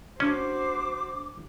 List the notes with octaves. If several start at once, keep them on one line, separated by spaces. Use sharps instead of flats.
C#4 D4 F#4 C5 D6